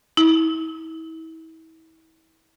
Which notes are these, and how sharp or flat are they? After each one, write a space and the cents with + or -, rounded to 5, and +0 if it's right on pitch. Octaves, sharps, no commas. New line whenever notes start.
E4 -35